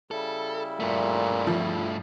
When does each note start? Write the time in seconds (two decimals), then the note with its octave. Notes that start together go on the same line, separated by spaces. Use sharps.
0.11 C#3 G3 E4 A4
0.80 G2 A#2 A3
1.47 F3